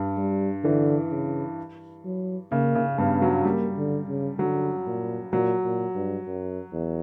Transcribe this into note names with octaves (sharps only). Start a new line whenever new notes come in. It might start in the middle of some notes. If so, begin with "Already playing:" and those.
Already playing: G2
G3
D3 E3
C#3
F#3
C#3 A#3
C#3
G2 B3
F#3
G3 A#3
D3
C#3
D3 F#3
A#2
A#2 F#3
A#2
G2
F#2
E2